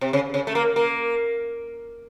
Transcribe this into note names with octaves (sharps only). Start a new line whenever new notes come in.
C3
C#3
C#3
A3
A#3
A#3